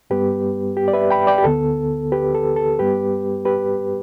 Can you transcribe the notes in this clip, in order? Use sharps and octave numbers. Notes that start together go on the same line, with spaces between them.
G2 G3 B3 G4 B4
G4
D5
B4 E5
G5 B5
D5 G5
G4
D2 D3 B3 A4
G4 B4
A4
A4
G2 G3 B3 G4 B4
G4 B4